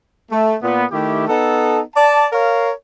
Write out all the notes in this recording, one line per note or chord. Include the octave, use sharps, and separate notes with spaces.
A3
A#2 B3
D#3 A3 E4 G4
B3 D#4 A4
D5 A5
A#4 C#5 F5